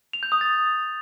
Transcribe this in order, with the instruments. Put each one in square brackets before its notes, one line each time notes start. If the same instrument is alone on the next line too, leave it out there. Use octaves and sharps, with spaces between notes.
[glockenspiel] F7
G6
D#6
A6